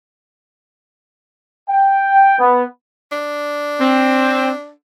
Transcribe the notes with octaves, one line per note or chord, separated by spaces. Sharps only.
G5
B3
D4
C4